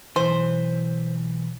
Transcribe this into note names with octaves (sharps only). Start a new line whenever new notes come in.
B1 E3 C5